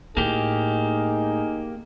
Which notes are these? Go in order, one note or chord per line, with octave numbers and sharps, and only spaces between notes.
A2 A#3 D#4 G4 G#4